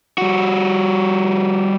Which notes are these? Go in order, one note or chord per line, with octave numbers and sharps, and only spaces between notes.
G3 F#4